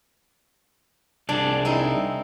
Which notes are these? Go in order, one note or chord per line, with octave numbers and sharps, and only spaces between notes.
C2 D4 G#4 D5
C4 D#4 E4